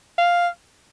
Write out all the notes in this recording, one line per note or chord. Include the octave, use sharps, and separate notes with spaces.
F5